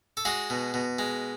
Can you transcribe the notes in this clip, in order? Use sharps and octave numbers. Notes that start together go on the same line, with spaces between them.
A4
G#3 F#4 G#4
B2
B2
G#3